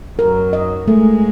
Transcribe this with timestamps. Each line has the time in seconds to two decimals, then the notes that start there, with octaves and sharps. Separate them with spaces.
0.19 F#2 F#3 A#4
0.53 D#5
0.87 G#2 G#3 A3